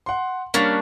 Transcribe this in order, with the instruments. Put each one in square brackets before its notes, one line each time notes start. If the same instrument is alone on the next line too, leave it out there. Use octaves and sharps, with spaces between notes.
[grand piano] F#5 C6
[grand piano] G3 A#3 [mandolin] C#4 D4